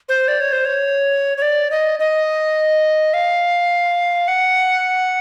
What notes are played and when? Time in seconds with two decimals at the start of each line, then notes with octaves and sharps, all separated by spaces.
0.09 C5
0.28 D5
0.41 C#5
0.52 C5
0.65 C#5
1.38 C#5
1.42 D5
1.71 D#5
1.99 D#5
3.14 F5
4.28 F#5